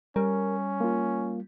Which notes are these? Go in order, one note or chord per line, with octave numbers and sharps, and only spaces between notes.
G3 C#4 A#4
A#3 F4